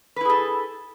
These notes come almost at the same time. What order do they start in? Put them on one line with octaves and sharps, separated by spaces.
B4 E4 G#4 A4